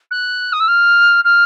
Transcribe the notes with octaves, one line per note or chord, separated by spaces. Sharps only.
F#6
D#6
E6
F6
F6